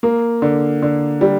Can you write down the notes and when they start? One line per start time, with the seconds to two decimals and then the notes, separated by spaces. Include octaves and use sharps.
0.03 A#3
0.42 D3
0.82 D3
1.21 G3